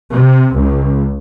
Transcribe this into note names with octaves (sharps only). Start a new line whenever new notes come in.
C3
C#2